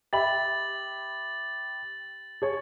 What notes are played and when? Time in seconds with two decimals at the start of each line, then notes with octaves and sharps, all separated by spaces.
0.13 G4 E5 B5 A6 F#7
2.42 G#4 C#5